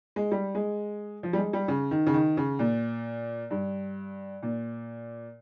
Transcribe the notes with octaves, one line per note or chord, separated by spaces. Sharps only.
G#3
G3
G#3
F3
G3
G#3
G3
C#3
D#3
C#3
D#3
C#3
A#2
G2
A#2